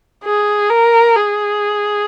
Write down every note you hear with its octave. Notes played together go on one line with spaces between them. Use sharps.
G#4
A#4
G#4